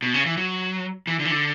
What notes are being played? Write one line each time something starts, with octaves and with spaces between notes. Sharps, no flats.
B2
C#3
E3
F#3
E3
D3
E3
D3